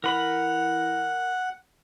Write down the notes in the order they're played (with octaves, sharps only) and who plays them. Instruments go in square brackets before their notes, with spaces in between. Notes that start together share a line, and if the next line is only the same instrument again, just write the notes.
[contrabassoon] E3 [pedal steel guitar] A#4 B5 [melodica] F#5